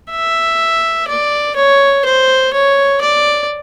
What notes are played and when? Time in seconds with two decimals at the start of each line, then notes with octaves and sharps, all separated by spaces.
0.11 E5
1.08 D5
1.56 C#5
2.05 C5
2.53 C#5
3.01 D5